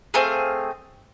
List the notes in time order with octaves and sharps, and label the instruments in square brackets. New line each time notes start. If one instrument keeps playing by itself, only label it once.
[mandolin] A3 C4 G#4 F5